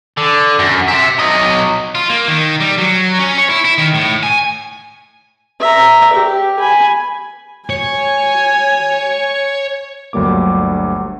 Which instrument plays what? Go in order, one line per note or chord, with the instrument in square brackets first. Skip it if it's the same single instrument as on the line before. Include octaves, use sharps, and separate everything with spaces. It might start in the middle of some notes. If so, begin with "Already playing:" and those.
[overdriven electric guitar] D3
F#2
C5 E5
F#3 D#5
[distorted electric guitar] F4
A#3
D#3
G3
F#3
C#4
C#5
E4
E4
D#3
A2
G#5
[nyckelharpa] E5 A#5
G4
G#5 B5
[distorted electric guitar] C#5 [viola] G#5
[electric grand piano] G1 D2 F#3 G3 A#3 D6